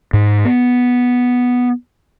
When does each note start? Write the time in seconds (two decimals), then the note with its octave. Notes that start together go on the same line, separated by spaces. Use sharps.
0.13 G#2
0.45 B3